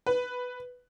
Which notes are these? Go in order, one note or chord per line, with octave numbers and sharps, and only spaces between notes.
B4